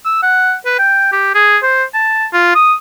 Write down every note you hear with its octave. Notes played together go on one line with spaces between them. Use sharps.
E6
F#5
B4
G5
G4
G#4
C5
A5
F4
D#6